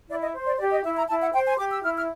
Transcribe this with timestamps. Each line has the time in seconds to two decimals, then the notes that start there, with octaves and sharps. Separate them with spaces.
0.08 E4 D5
0.21 D#5
0.34 C5
0.46 D5
0.59 G4 D5
0.72 D#5
0.84 E4 E5
0.96 A#5
1.08 E4 A5
1.21 F#5
1.34 C5 G5
1.47 G#5
1.59 G4 D6
1.72 E6
1.83 E4 F6
1.96 F6